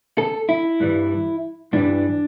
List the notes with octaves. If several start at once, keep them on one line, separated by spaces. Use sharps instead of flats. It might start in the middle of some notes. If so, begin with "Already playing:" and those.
A4
E4
G2 E3 G3
G2 E3 G3 D4